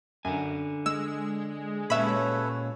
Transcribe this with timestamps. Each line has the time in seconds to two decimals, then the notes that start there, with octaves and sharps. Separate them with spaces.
0.25 F#2 D3 G#5
0.86 G#3 E6
1.90 A#2 C#4 A4 B4 C#5 E5 B5